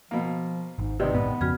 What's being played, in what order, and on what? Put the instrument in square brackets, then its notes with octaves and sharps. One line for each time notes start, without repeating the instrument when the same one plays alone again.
[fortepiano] B2 A#3 [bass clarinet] F3
[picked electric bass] G#1 [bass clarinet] G#2
[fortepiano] C3 D#3 [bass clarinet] C4 [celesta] B4 D5 D#5
[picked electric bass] A#1 G#2 [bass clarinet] B3
[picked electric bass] F2 C#3 [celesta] F#4 F6 G#6